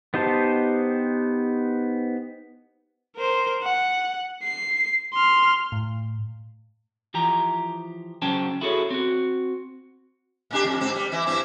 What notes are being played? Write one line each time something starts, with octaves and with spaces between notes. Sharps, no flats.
B3 D#4 G4 C5 A5
A#4 C5
F#5
C7
C6 F6
A2
E3 F3 G4 A#5
C#3 F#3 C#4 C5 G5 A5
E4 F#4 G#4 A4 C5 C#5
C4 F#4
A2 D4 G4
F2
G#2 C4
G3
E3 E4
G2 C4 E4